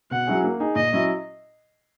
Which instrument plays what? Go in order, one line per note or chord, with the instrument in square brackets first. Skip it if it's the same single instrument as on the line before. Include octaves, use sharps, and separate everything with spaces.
[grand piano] B2 [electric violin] F#5
[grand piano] F#3 C#4 E4 G#4
A#3
D#4 G#4
[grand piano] A#2 [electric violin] D#5
[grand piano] F#3 C#4 E4